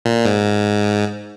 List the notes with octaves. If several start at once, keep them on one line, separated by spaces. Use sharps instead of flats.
A#2
G#2